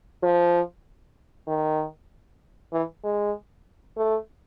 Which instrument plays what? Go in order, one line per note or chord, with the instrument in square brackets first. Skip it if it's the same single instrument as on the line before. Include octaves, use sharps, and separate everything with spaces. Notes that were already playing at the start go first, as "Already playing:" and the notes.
[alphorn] F3
D#3
E3
G#3
A3